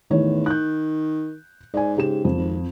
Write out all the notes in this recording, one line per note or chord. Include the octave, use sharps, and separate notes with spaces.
A1 E2 D#3 C#5
D#3 F#6 G6
G#2 D5 G#5
C#3 G4 E7
D#1 F2
G#1